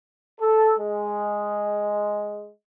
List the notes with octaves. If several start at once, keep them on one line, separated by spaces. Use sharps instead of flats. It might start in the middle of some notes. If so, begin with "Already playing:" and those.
A4
G#3